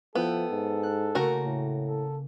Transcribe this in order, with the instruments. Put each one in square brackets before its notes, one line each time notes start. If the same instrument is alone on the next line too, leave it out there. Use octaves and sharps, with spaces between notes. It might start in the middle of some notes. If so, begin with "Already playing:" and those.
[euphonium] F3 [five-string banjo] B3 [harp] E4 G5 [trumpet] A4
[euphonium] G#2
[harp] F#6
[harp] C#3 A#3 [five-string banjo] A3 F#4 A#4
[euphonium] A2
[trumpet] A4